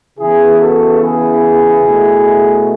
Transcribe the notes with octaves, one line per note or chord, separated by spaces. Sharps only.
C#3 E3 B3 E4 G#4
F#4 A4
E4 G#4
B2 A3